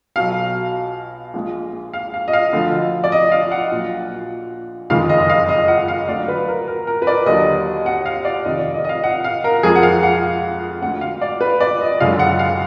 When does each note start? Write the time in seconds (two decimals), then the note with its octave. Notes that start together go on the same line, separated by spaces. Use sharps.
0.16 B1 B2 F#3 F5
1.34 A#1 A#2 G#3
1.93 F5
2.14 F5
2.28 D#5
2.33 F5
2.53 D2 D3 F3
3.04 D5
3.12 D#5
3.32 F5
3.52 F#5
3.72 A#1 A#2 F#3
4.90 F#1 F2 D#3 G#3 F5
5.09 D#5
5.20 D#5
5.30 F5
5.49 D#5
5.68 F#5
5.88 F5
6.08 D2 D3 F#3 D5
6.28 B4
6.48 A#4
6.68 A#4
6.87 A#4
7.02 B4
7.07 D5
7.26 D#2 D3 F#3 D#5
7.86 F#5
8.06 F5
8.25 D5
8.45 F1 F2 D#3 D#5
8.59 D5
8.74 D#5
8.85 D#5
8.89 F5
9.04 F#5
9.24 F5
9.44 A#4
9.63 F2 F3 G#3 G#4
9.75 F#5
9.83 F5
10.03 F#5
10.82 D2 D3 G#3 F#5
11.01 F5
11.21 D5
11.41 B4
11.61 D5
11.81 D#5
12.00 F#1 F#2 D3 G#3 F5
12.19 F#5
12.39 F5